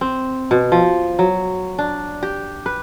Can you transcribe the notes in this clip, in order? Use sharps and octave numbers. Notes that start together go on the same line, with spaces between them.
C4
B2
F3
F#3
D4
G4
B4